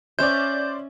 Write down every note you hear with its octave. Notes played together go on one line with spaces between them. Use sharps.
C#4 C5 D5 E5 G6